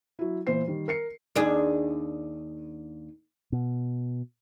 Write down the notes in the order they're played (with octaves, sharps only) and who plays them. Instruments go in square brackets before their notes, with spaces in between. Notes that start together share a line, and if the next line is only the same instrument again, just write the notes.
[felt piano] F#3 E4
A#2 E3 C5 C7
D#3 G3
A#4 C7 C#7
[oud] D#2 D4 G#4
[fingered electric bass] B2